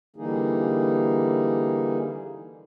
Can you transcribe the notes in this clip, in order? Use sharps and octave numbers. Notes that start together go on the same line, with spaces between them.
D3 E3 G3 A#3 D#4 G#4